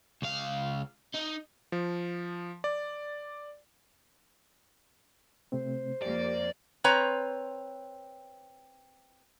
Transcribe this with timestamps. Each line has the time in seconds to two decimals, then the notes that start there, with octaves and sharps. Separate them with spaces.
0.22 C#2 F5
1.14 D#4
1.72 F3
2.64 D5
5.52 C3 A3 C4 C5
6.02 F2 A#3 G4 D5
6.84 C4 B4 C#5 A#5